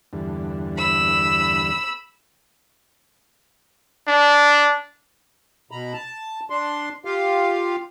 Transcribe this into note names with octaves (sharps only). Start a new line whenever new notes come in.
E2 G2 D3
B5 E6
D4
B2 A#5 B5
A5
D4 C6
F4 G4 F5